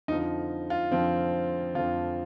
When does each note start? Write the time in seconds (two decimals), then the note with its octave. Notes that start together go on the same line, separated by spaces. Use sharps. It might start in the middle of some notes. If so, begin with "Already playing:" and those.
0.08 F2 D3 F3 D#4
0.70 F4
0.91 F2 D3 F3 C4
1.75 F2 D3 F3 F4